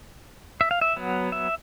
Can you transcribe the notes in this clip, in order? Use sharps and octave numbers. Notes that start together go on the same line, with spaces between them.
E5
F5
E5
F#3 B3
E5